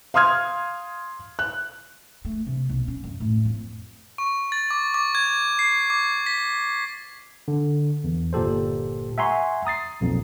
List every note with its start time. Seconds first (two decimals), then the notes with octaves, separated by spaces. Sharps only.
0.14 F5 C6 D#6 F6 G#6
1.39 F#6
2.25 A3
2.47 C3
2.69 B1
2.88 C#4
3.04 F#2
3.20 A2
3.45 F2
4.18 C#6
4.52 A6
4.71 D6
4.94 D6
5.15 G#6
5.59 C7
5.90 D6
6.26 B6
7.48 D3
8.04 E2
8.33 G1 A#2 G4 A4 C5
9.18 E5 F#5 G#5 A#5 C6 C#6
9.65 A#5 D#6 A6 C7
10.01 B1 F2 A#2